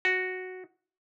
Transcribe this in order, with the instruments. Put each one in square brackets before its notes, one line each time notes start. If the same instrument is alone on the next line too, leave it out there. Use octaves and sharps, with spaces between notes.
[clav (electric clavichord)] F#4